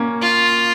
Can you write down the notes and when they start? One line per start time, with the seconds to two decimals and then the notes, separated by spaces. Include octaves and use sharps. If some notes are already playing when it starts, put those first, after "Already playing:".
Already playing: A#3 C#4
0.22 F4